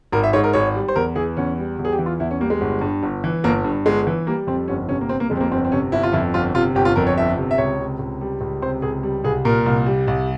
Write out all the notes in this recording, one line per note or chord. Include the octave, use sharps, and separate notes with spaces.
G#1 A#4
E5
G#2 C#5
A#4
G#1 C#5
G3
C5
E2 A#4
E3 G#4
E2 C#4
G3
E2
G#4
G4
E3
F4
E2 E4
C#4
G3 A#3
G#3
G1
G2
G1
E3
G1 A#3
G2
G1 G#3
E3
G3 A#3
F2 C4
G1 C#4
C3 C#4
A#3
G3 C4
A#3
F2 G#3
C4
A#3
G1 C4
C4
C3 C#4
G1 E4
F4
F2 E4
G1 F4
C3 F4
G1 G4
F4
F2 A#4
C#5
G1 E5
C3
E5
C#2 C#5
C3
C#2
G3
C#2
C3 C5
C#2 G#4
G3
C2 G#4
A#2 A#4
C2
G3
C2